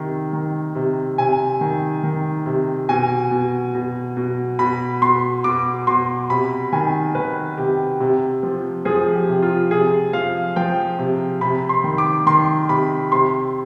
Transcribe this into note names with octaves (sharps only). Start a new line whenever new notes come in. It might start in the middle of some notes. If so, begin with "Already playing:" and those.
Already playing: C3 D#3
D#3
C3
C3 G#5
D#3
D#3
C3
B2 G#5
B2
B2
B2
B2 B5
B2 C6
B2 D6
B2 C6
C3 B5
D#3 G#5
D#3 B4
C3 G4
C3
F3
F3 G#4
G4
C3
F4
C3 G#4
F3 F5
F3 G5
C3
C3 B5
C6
D#3
D6
D#3 C6
C3 B5
C3 C6